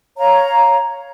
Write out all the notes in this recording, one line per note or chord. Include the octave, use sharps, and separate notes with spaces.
C#5 F5 A#5